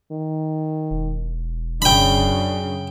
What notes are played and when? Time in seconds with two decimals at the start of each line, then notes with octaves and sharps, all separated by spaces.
0.12 D#3
0.91 E1
1.82 F#2 C#3 D4 G5 B5